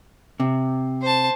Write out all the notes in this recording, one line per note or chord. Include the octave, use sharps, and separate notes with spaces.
C3
C5 A5